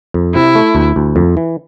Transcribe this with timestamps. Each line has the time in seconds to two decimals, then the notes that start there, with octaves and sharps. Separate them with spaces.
0.14 F2
0.34 C3 E4
0.55 A3
0.75 D2
0.96 D2
1.16 F2
1.37 E3